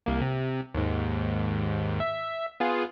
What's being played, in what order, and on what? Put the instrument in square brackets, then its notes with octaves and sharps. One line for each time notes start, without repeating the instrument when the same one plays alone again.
[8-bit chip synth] C2 A#3
C3
D#2 G#2
E5
B3 F4 G#4